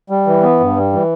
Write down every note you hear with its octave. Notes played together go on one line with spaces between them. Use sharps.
G3
E3
B3
G2
G3
E3